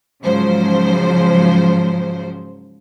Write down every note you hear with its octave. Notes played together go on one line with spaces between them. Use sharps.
G#2 C#3 F3 F#3 C5